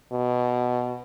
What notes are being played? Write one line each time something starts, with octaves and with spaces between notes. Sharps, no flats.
B2